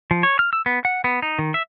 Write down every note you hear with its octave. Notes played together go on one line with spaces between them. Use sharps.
F3
C#5
F6
E6
B3
F#5
B3
D#4
D#3
E5